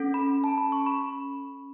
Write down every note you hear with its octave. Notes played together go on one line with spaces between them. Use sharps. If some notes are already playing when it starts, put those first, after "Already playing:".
Already playing: C#4 A4
B5
A5
B5
C#6
B5